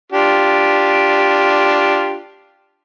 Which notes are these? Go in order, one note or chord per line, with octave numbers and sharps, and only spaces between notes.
D4 F4 G4